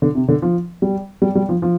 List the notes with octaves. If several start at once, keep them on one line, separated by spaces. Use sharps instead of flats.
D3
C3
D3
F3
G3
G3
G3
F3
F3